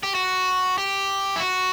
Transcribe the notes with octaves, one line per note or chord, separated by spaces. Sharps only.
G4
F#4
G4
E4
F#4